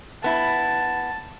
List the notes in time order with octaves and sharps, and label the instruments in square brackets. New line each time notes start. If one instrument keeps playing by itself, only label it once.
[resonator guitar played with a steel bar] B3 E4 [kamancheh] A5